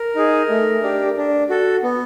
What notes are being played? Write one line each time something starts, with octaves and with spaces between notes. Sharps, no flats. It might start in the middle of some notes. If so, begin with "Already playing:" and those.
Already playing: A#4
D#4 G#4
A3
D4 G4
D4
F#4 A4
B3